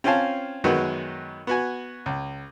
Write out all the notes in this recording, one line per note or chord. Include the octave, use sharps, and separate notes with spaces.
C4 C#4 F4 F5 G#5 A5
F#2 D#3 G#3 B3 F#4 D#5
B3 F#4 G#5
C#2